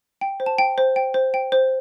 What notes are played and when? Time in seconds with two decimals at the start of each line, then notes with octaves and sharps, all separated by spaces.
0.21 G5
0.40 C5
0.46 A5
0.58 G5
0.78 C5
0.96 G5
1.14 C5
1.34 G5
1.52 C5